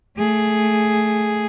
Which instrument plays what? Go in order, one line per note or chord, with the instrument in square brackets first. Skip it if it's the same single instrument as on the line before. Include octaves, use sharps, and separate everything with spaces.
[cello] A3 G#4